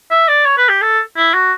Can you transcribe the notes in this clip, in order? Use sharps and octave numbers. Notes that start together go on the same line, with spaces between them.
E5
D5
C#5
B4
G4
A4
E4
F#4